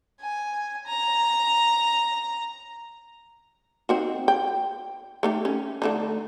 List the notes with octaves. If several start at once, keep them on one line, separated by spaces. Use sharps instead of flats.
G#5
A#5
C4 D#4 F#4
G5
A3 D#4 G4
C#4
D3 A3 D#4